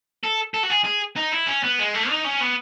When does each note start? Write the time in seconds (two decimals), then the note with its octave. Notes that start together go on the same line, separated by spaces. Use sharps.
0.23 A4
0.54 A4
0.63 F#4
0.70 G#4
0.85 G#4
1.16 D#4
1.32 E4
1.47 C#4
1.63 B3
1.79 G#3
1.94 A3
2.10 D#4
2.25 C#4
2.41 B3